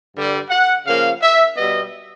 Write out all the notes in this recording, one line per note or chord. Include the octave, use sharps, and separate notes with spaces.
G2 D3 G3
F#5
C#3 F3 A#3 F5
E5
B2 G3 B3 D#5